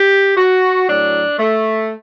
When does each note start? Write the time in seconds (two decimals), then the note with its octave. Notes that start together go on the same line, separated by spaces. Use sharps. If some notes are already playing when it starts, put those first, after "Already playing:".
Already playing: G4
0.37 F#4
0.88 A2 F#3 D4
1.39 A3